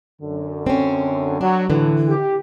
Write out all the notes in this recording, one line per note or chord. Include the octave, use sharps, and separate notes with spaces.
F#2 D3
C4 C#4
F#3 D4
A2 D3 E3
G4